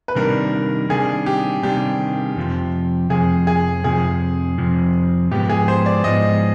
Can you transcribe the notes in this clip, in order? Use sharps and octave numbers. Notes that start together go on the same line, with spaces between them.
B4
C3 D#3 G3 A#3 D4 A#4
C3 D#3 G3 A#3 D4 G#4
G4
C3 D#3 G3 A#3 D4 G4
F2 C3 F3
F2 C3 F3 G#4
G#4
F2 C3 F3 G#4
F2 C3 F3
G#2 F3 G#3 B3 G4
G#4
C5
D5
G#2 F3 G#3 B3 D#5